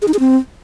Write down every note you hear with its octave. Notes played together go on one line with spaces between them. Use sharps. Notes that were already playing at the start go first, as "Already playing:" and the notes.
G#4
D#4
G#4
C4